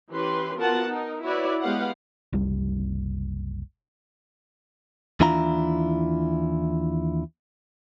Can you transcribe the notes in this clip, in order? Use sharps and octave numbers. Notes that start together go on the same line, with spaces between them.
E3 C#4 G4 B4 C6
B3 F4 F#4 A#4 F#5 A5
D#4 A#4
E4 F#4 B4 C#5 D5
G#3 B3 G4 B4 F5 F#5
F#1 C2 G3
D#2 E3 D4 E4 F4 A#5